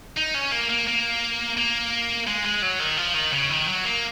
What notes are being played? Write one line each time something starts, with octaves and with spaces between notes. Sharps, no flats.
D#4
C#4
A#3
A#3
A#3
A#3
G#3
G#3
F#3
D#3
F3
D#3
C#3
D#3
F#3
A#3